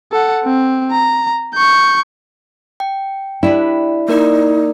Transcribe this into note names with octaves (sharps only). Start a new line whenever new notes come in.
A4 F#5
C4
A#5
C#6 G6
G5
G3 D4 E4 B4
A#3 D#4 A#4 D5